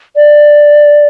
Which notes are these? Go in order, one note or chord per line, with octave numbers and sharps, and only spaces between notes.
D5